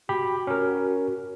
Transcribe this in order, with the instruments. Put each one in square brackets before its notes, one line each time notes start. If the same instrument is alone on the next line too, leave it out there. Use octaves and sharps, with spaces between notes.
[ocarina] F#4 [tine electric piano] G4 B5
[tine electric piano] C#4 A#4